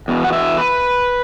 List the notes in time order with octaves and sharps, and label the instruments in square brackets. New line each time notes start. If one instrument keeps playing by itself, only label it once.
[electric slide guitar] E2 B2
F#5
E5
B4